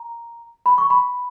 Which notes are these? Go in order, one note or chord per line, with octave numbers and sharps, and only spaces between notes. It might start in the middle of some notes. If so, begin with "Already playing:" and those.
Already playing: A#5
B5
C#6
B5